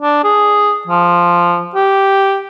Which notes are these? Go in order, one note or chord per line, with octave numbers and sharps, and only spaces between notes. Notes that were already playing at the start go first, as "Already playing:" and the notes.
D4
G#4
F3
G4